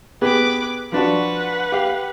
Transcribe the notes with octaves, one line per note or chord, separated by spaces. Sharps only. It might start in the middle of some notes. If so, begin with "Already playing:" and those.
B3 G4 G#4 B4 D6
F3 D4 F#4 B4 F#5
G4 F5